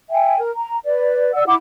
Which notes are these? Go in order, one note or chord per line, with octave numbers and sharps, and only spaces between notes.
E5 G5 G#5
A#4
A#5
B4 D5
D5 F#5 E6
E4 F#5 D6